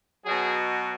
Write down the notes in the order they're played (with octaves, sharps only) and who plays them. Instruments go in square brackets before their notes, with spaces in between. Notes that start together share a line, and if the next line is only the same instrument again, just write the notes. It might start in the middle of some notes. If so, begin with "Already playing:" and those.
[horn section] B2 F#3 G#4